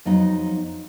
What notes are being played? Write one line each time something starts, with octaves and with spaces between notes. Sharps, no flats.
F2 F#3 B3 D#4 F#5